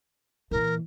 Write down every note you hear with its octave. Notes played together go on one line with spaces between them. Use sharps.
A#2 E3 A#4